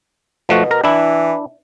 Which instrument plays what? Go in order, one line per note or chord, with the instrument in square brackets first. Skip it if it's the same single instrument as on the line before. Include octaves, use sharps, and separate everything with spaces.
[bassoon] B2 [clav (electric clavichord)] F3 A3 F#4
[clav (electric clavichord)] A#4 A#5
[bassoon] E3 [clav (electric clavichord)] D4 E4